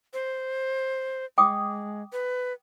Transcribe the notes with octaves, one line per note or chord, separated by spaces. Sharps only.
C5
G#3 G5 D6 D#6
B4